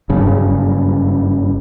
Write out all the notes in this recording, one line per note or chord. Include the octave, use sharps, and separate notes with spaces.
F#1 G2 C#3